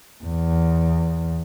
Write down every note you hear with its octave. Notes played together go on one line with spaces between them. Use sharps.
E2